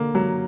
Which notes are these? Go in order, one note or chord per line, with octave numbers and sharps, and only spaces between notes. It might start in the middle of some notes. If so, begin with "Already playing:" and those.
Already playing: D3 A#3
F#3